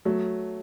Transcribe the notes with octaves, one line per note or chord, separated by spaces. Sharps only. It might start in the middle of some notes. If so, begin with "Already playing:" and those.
F#3 A3